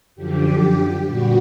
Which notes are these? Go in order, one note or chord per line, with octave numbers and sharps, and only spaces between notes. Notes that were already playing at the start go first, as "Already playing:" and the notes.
F#2 D3 F3 G4
A#2 G3 B3 F#4